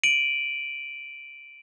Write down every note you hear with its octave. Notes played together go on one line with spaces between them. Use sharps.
D7 D#7 F#7